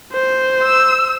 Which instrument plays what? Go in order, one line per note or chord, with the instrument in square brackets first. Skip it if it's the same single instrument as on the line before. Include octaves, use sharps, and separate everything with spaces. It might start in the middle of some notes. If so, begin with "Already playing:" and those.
[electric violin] C5
[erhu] E6